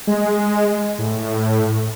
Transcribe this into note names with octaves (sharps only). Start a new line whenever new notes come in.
G#3
A2